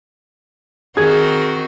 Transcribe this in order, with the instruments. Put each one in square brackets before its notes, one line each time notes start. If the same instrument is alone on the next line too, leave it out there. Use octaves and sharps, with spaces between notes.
[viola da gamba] D#3 C4 F#4 [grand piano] G#4 G#6